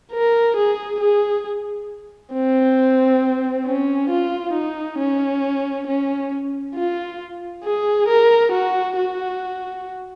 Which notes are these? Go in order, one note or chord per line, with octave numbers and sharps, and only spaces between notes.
A#4
G#4
G#4
C4
C#4
F4
D#4
C#4
C#4
F4
G#4
A#4
F#4
F#4